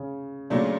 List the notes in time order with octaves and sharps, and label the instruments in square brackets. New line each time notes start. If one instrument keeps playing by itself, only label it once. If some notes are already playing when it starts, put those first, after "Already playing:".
Already playing: [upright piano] C#3
[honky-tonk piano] A#2 F#3 A3 D4 [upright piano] C#3